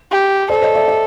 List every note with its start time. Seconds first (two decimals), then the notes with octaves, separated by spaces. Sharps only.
0.11 G4
0.49 A4 C5 D5
0.62 C#5 D#5
0.75 D5 E5
0.88 D5 E5